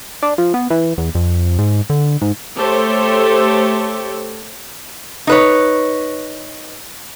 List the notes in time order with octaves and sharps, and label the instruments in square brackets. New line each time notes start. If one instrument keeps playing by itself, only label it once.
[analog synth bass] D4
F3
B3
E3
E2
F2
G#2
D3
G#2
[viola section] A3 G4 A4 C5 C#5
[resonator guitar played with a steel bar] D#4 B4 C#5